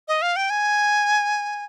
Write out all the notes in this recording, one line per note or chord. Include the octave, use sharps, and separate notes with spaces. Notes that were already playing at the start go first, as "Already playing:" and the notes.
D#5
F5
G5
G#5